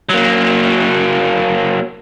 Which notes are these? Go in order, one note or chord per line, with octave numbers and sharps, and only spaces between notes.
F#3 A#3